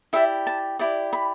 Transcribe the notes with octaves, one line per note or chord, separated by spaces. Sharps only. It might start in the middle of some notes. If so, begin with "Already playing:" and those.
E4 G4 D5 E5
A5
E4 G4 D5
B5